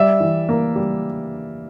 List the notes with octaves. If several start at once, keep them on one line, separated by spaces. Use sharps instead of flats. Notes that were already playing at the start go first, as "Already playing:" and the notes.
Already playing: G3 D5 E5
E3
A#3
G3